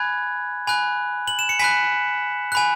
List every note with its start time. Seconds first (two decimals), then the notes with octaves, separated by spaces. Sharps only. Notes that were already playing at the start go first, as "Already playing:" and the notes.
Already playing: G#5 B5 F#6 G#6
0.67 G#5 B5 F#6
1.28 F#7
1.39 E7
1.49 C#7
1.59 G#5 B5 F#6 B6
2.52 G#5 B5 F#6